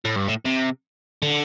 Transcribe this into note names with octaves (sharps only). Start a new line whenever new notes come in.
A2
G2
A2
C3
D3